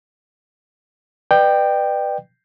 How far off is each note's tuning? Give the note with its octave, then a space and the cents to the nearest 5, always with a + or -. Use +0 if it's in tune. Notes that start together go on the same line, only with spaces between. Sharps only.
B4 +0 D5 +40 G5 +0